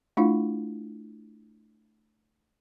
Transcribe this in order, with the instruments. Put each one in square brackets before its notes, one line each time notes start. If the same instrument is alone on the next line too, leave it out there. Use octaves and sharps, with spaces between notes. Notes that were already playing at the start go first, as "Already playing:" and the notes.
[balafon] A3 D4 E4 F4 F5